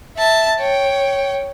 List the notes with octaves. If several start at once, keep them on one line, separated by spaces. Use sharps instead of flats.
E5 A5
C#5 G5